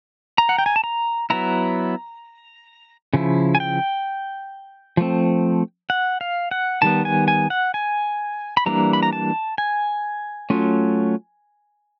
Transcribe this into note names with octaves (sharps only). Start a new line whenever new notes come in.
A#5
F#5
G5
G#5
A5
A#5
F#3 B3 E4 A#5
C#3 F3 E4
G#5
G5
F3 A3 C4
F#5
F5
F#5
D#3 G3 B3 A5
G#5
G#5
F#5
G#5
B5
E3 G3 A#3 D4 A#5
B5
A#5
A5
G#5
F#3 A3 C#4 F4